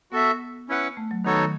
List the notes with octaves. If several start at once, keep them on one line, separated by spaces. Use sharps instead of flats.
B3 F#4 A4 E5
C#4 E4 B4 F#5
A3
F#3
D#3 B3 D#4 F#4 A4 C#5
D#3